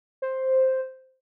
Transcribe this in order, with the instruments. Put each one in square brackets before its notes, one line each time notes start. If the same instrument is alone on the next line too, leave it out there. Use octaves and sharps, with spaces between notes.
[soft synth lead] C5